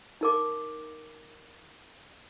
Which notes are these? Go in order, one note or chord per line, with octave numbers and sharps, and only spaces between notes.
D#4 A#4 D6